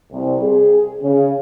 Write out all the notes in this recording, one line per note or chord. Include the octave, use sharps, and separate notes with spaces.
C2
G#4
C#3